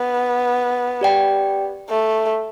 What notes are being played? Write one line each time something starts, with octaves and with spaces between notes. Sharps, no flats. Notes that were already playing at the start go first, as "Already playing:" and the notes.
Already playing: B3
G4 D5 G5
A3